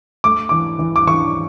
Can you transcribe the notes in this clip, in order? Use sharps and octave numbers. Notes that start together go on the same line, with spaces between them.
A3 D6
E3 D6
E3
D6
E3 C#6